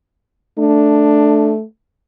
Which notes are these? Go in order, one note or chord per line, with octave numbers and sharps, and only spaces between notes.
A3 D4